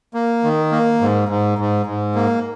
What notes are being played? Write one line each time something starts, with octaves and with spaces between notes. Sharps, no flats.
A#3
D#3
A#3
G#2
G#2
G#2
G#2
A#3